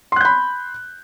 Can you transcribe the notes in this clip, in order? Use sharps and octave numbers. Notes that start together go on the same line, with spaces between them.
B5 C6 F#6 G6